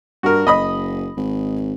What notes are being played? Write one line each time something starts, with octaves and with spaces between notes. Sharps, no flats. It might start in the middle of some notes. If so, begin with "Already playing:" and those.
G2 F#4 A#4
F#1 D#5 B5 D#6
G#1